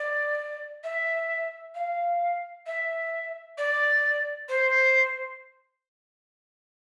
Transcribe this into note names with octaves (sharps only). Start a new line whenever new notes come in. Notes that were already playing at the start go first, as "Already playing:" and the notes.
Already playing: D5
E5
F5
E5
D5
C5